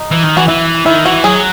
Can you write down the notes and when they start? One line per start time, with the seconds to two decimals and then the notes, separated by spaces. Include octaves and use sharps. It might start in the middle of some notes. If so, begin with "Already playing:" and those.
Already playing: D#4
0.11 E3
0.23 D#3
0.37 E3 F#4
0.48 E3 E4
0.86 D#3 E4
1.05 E3 F#4
1.24 F#3 G#4